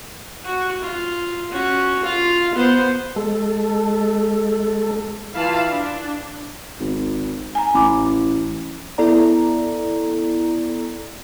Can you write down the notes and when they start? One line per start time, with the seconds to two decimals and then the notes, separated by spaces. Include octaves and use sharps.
0.44 F#4
0.82 F4
1.51 C#4 F#4
2.03 F4 F5
2.55 B3 C5
3.16 G#3 A4
5.35 E3 E4 F4 F5 A5 B5
5.71 D4
6.80 G#1
7.55 G#5 A#5
7.74 A1 B5 D6
8.98 B3 E4 A4 D5 A#5